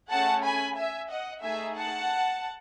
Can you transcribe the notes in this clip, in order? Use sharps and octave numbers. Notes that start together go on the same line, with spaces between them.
A3 C#4 G#4 F#5 A5
G#5 B5
E5 G#5
D#5 F#5
A3 D#4 G#4 E5 G#5
F#5 A5